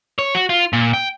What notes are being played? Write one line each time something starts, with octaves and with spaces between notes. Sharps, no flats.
C#5
F#4
F4
A#2
G5